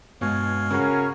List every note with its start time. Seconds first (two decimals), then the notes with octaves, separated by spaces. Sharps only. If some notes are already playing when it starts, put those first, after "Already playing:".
0.21 G2 B2 G#3 C#5 F5 G#5
0.70 C#3 C#4 F#4 A#4